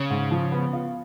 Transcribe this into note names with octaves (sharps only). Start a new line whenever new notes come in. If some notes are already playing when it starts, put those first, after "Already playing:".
Already playing: C#3
G#2
F3
B3
F4